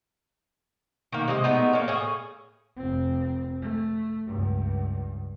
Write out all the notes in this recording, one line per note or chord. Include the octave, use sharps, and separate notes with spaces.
D#3 A#3
C3 G#3 D#5
G#3 A3 B3 D#4
A#3 C#4
A2 C#4 G#4
F1 C4
A3
C#2 G2